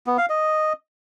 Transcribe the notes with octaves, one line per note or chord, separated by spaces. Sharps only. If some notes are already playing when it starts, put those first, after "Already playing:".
B3
F5
D#5